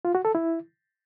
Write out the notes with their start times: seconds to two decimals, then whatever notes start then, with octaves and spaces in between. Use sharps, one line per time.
0.05 F4
0.15 F#4
0.25 A4
0.35 E4